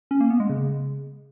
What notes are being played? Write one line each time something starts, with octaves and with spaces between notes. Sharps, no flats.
C#4
A#3
B3
G#3
C#3